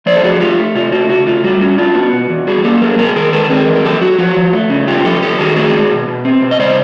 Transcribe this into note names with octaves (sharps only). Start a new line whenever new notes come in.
F3 C5 D5
A4
F3 F#4 G#4
A3 F4 G4
A3
C3 F4
A3 F#4
C#3 F#4
A3 F4
G3 F#4
C#4 F#4
D4 F4
B3 F#4
B2
E2
G3 F#4 G#4
A#3 G4 A4
F#3 G#4 A#4
C3 G#4 A#4
D#3 G#4 A#4
D#3 A4 B4
C4 G#4 A#4
E3
A#4
F#3 G4 A4
F#3 F#4
F3 F#4
F3
A3
C#3
G2 F4 G4
F3 G4 A4
F#2 G4 A4
D#3 F#4 G#4
A3 F#4 G#4
G#2
B2
B2
C4
B2
D#5
C#3 C5 D5